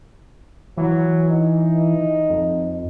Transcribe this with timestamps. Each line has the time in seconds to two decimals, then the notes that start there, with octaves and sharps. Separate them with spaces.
0.78 E3 F#3
1.30 D#4
2.30 F2